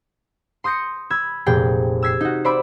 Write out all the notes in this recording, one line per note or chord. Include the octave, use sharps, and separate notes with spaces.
C6 D#6 G6 A#6 C#7
B5 E6 G#6
F1 A#2 G#4 G5
E6 G#6 B6 C7
D#4 F#4
C5 D5 E5 B5 D6